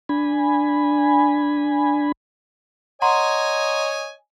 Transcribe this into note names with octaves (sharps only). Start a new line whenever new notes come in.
D4 G#5 B5
C#5 D#5 F#5 G#5 A#5 C6